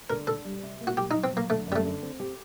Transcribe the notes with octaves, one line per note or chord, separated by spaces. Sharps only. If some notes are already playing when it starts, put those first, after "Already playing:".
D3 A#4
D4 A4
G3
C3
A#3
F#4
F#3 G4
D#4
F#3
C4
F#3 A#3
D3 A3
F#2
G3
A3
D3
C4
G4